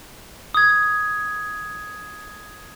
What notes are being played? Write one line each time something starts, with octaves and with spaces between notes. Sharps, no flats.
D#6 G#6